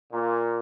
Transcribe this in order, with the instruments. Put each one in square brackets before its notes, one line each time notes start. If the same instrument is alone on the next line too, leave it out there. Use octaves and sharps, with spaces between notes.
[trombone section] A#2